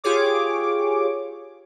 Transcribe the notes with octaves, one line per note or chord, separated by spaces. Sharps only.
F4 G4 G#4 C#5 D6